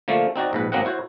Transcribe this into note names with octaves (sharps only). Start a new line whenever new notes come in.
D3 F3 A3 A#3
C4 D#4 F#4 D5
A#1 G#2 B4
G#1 F#3 A#3 C4 D#5 F#5
E4 F#4 C5 C#5